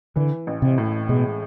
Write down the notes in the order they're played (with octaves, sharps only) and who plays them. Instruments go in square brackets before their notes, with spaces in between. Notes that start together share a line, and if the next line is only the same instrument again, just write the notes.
[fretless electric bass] D3 [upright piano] E3
[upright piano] A1
[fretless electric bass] C3
[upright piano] A2
[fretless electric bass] B2 [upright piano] G#3